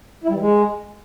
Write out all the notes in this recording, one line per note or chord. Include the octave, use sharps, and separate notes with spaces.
E4
G3
E3
G#3